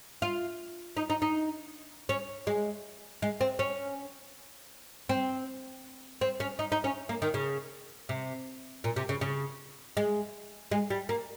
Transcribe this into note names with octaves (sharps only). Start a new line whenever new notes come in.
F4
D#4
D#4
D#4
C#4
G#3
G#3
C4
C#4
C4
C4
C#4
D#4
D#4
C#4
A#3
D#3
C#3
C3
A#2
C3
C#3
C#3
G#3
G#3
G3
A#3